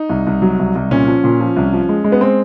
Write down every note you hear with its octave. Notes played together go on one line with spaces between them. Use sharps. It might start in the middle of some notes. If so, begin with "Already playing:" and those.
Already playing: D#4
C2
C2
F#3
C2
C2
A#2 C#4
F3
A#2
F3
C2
F3
G#3
G#3
B3
G#3 C4